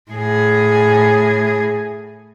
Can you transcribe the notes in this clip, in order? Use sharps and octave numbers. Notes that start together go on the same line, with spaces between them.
A2 G#4